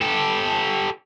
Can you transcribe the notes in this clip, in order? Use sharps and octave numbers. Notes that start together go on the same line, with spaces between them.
G4 A4